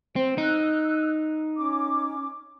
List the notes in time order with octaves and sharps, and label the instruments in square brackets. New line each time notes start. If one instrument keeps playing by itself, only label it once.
[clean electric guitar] C4 [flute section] C5
[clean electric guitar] D#4 [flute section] E6 F#6
[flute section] C#4 D6